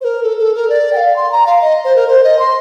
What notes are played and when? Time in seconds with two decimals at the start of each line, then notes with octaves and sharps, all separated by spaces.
0.01 C5
0.04 A#4
0.23 A4
0.39 A4
0.55 A#4
0.70 D5
0.93 G5
0.97 F5
1.16 C6
1.32 A#5
1.46 F5
1.62 D#5
1.85 C5
1.96 A#4
2.07 C5
2.24 D#5
2.39 C6